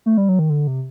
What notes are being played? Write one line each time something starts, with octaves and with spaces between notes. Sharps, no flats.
A3
G3
F#3
D#3
D3
C3